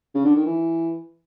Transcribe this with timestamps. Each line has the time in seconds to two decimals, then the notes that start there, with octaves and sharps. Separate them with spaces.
0.15 C#3
0.25 D3
0.36 D#3
0.46 E3